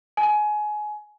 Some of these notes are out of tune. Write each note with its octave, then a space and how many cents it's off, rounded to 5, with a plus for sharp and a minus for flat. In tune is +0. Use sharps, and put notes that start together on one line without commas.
G#5 +25